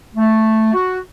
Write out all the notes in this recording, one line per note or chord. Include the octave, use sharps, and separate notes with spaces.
A3
F#4